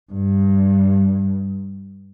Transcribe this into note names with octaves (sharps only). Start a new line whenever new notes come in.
G2